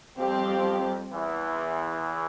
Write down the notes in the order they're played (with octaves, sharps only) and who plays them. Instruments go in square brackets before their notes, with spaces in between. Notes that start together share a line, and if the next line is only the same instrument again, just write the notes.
[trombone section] F2 F3 [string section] G3 C4 G4
[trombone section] E2 E3